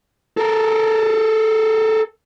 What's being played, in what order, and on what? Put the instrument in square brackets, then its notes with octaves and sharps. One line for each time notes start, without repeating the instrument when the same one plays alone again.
[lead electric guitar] A4 A#4